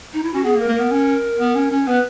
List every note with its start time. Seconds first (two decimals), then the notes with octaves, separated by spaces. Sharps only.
0.14 D#4
0.23 E4
0.34 C#4 F#4
0.44 B3 G#4
0.55 A#3
0.60 A#4
0.68 A#3
0.75 B3 A#4
0.91 C#4
1.39 B3
1.55 C#4
1.71 C#4
1.87 B3 B4